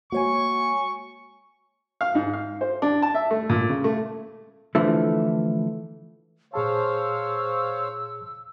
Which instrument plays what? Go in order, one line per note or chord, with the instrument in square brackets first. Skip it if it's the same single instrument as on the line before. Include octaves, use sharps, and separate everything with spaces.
[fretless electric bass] G#3 A#3 [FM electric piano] F#4 C#5 G#5 [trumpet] C#6
[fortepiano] F5
G#2
F5
C5
D4
A5
E5
A3
A#2
C#3
A3
[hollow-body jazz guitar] D3 E3 F3 A3
[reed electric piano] A#2 G#4 A5 [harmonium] C5 C#5 F5 [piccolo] E6